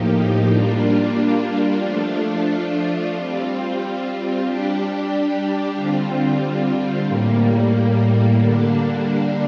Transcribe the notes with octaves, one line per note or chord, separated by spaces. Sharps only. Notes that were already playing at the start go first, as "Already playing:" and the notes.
Already playing: A2 F3 A#3 D#4 G4
G3 A#3 D4 F4
F3 A3 D4 F4
G3 C4 F4
G3 D4 G4
D3 G3 C4 F4
A2 G3 A#3
D3 G3 A#3 D4